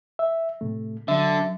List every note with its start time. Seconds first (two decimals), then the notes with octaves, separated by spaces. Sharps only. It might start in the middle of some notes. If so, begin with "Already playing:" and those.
0.19 E5
0.61 A2 C3 A3
1.08 D3 F#3 E5